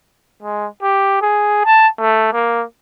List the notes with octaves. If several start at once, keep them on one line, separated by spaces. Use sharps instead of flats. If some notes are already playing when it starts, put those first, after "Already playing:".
G#3
G4
G#4
A5
A3
A#3